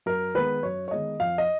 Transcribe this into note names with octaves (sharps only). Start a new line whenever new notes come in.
F#2 A#4
D#3 G#3 B3 B4
F#2 C#5
C#5
D#3 G#3 B3 D#5
F2 F5
D#5